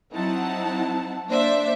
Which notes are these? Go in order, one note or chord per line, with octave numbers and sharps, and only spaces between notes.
F#3 C4 D#4 E4 F#5 A5
A#3 D4 C5 D5 E5